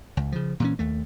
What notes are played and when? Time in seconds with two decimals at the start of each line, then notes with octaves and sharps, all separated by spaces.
0.17 C#2
0.32 C#3 F3
0.60 A#2 E3 C#4
0.79 D#2 A3